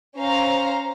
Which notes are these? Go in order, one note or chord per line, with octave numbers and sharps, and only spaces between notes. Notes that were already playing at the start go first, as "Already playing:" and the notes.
C#4 C5 F5 A#5